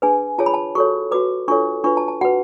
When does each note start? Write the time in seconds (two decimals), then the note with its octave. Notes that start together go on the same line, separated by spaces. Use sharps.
0.02 D4 G#4 B4 G#5
0.38 F4 G#4 C#5 A5
0.46 B5
0.54 A5
0.75 F#4 A4 C#5 C#6
1.11 F#4 B4 D6
1.48 D4 F4 A4 C#5 C#6
1.84 D4 F4 B4 C#6
1.97 A5
2.08 A5
2.21 F#4 B4 F#5